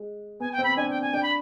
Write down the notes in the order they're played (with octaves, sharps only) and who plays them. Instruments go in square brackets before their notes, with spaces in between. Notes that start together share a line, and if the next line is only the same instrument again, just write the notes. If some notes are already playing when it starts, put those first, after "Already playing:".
Already playing: [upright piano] G#3
[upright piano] B3 [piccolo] G#5
[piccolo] G5
[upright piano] C4
[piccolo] B5
[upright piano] D4 [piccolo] G#5
[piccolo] G5
G#5
[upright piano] D4 [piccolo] G5
[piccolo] B5